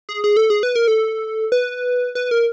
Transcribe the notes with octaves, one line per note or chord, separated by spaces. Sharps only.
G#4
G#4
A4
G#4
B4
A#4
A4
B4
B4
A#4